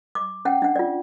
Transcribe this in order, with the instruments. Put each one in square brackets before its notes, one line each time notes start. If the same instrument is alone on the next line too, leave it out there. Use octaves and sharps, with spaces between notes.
[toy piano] D6
C#4 F#5 G5
D4 F#5
F4 D5